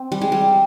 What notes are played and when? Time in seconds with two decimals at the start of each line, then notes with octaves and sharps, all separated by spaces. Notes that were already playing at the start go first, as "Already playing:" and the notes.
Already playing: C4
0.12 G3
0.21 G#3
0.32 G3